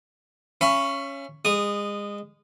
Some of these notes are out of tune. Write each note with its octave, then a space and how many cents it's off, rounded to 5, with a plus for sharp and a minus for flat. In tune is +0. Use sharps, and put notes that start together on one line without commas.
C#4 +0 F5 -45 B5 +20
G#3 -30 D#6 -10